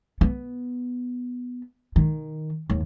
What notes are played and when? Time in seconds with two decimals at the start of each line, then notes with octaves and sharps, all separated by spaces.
0.21 B3
1.96 D#3
2.70 D#2